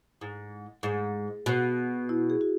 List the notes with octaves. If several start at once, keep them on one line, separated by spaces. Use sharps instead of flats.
G#2
G#2 G#4
B2
E4
G#4
F#4